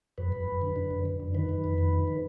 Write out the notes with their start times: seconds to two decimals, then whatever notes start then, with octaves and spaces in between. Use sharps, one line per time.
0.18 F#2 B4
0.32 F#2
0.47 F#2
0.62 D3
0.76 D3
0.91 F#2
1.05 D3
1.20 F#2
1.34 D#3 B4
1.49 D#3
1.64 F2
1.78 D#3
1.93 D#3
2.08 D#3